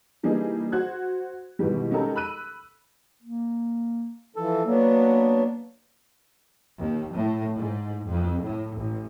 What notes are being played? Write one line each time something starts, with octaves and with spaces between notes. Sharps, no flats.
E3 G3 A#3 D4 D#4 G#4
F#4 C5 F#6 G#6
G#2 B2 D#3 E3 G3
G#3 C#4 D#4 G4 A4 A#4
B5 E6 F#6 D#7
A#3
E3 F3 A4
F#3 A#3 B3 D4
D#2
A2
G#2
F2
A2
A1